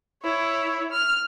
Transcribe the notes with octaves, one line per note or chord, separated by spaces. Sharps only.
E4 C#5
F6